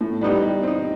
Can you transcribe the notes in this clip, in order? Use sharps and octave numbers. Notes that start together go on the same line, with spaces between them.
A2
G3 B3 D#4 G4
G3
C4 D#4